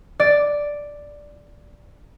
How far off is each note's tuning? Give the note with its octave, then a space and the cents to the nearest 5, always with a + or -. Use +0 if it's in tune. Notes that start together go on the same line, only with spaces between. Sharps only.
D5 +0